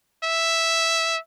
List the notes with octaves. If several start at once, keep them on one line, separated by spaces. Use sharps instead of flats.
E5